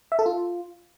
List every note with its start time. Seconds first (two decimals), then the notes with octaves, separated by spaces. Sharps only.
0.12 E5
0.19 A4
0.26 F4